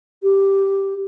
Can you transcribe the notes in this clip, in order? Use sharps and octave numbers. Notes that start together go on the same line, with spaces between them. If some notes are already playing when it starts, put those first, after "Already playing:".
G4